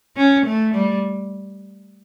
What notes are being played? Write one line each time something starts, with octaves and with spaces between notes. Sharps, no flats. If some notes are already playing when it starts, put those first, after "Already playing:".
C#4
A3
G3